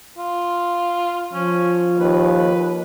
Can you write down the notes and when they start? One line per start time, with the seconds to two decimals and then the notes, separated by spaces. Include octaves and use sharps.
0.18 F4
1.33 F3 C#4
1.99 D#2 B4